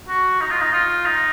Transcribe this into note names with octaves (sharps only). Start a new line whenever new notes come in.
F#4
D#4
F4
D#4
F4
D#4